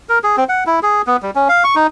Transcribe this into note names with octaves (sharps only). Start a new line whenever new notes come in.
A#4
G#4
C4
F#5
E4
G#4
B3
G3
C#4
F5
C#6
D#4